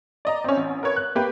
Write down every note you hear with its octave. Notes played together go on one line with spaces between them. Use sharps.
D5 D#5 A#5
C4 C#4
A1
A#4 B4 C#5
F#6
A#3 G4 B4